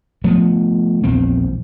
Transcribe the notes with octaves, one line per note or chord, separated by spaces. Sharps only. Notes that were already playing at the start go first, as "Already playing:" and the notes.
F3 A3 B3
A#1 E2 C4